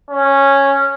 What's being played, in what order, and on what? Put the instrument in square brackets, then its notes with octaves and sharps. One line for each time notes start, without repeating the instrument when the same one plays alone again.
[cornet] C#4